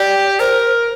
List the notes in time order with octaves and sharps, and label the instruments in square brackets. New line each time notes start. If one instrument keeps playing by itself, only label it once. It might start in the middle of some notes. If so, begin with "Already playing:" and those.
Already playing: [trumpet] G4 [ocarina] D5
[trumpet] A#4 [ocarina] C5